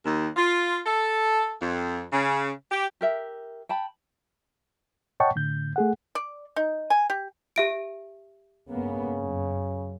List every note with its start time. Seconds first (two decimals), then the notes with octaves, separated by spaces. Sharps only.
0.05 D#2
0.36 F4
0.85 A4
1.61 F2
2.12 C#3
2.71 G4
3.01 G4 A#4 E5
3.69 G5 A5 B5
5.20 C#5 D#5 F#5 G5 A5 C#6
5.36 A2 D3 G6
5.76 A3 G#4 F#5
6.15 D5
6.56 D#4
6.90 G#5
7.10 G4
7.56 G4 E5 D7
8.69 G2 C#3 A#3 B3
9.19 F#2